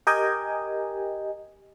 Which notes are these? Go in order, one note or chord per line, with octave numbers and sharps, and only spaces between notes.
G4 A#4 D#5 G5 G#5